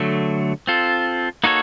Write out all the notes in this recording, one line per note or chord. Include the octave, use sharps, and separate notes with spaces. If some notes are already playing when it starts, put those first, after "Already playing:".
Already playing: D3 F#3 A3
C4 F4 A4
A#3 D#4 F#4 A4 C#5